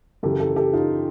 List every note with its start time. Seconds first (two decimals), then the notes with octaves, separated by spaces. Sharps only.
0.23 F#2 C#3 E3 G4 A4
0.40 G4 A4
0.56 G4 A4
0.73 D#4 F4